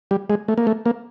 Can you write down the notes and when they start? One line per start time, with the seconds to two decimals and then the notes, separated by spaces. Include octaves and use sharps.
0.11 G3
0.30 G#3
0.48 A3
0.58 A#3
0.67 A3
0.86 A#3